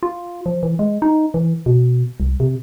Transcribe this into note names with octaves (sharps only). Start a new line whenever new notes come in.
F4
F3
E3
G#3
D#4
E3
B2
C2
C3